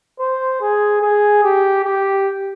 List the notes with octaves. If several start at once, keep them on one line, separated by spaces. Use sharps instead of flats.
C5
G#4
G#4
G4
G4